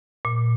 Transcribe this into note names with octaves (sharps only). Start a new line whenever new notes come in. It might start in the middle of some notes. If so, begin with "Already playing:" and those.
A#2